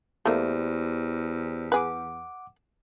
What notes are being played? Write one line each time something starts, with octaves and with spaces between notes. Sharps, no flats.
E2 A3 A#3 G4 C5 D5
G#4 B4 F#5 D6